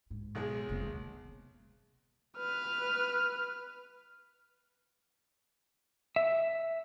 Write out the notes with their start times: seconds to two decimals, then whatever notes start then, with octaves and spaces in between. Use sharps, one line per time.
0.10 G#2
0.35 B1 G#3
0.69 F1 A#3
0.82 D#3 G3
2.37 B4 F6
6.16 E5